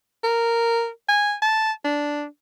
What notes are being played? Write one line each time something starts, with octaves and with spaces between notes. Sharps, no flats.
A#4
G#5
A5
D4